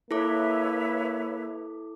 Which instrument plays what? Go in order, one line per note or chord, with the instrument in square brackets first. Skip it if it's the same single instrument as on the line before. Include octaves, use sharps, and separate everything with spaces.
[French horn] A#3 [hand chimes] E4 A4 D6 [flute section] B4 C#5 E5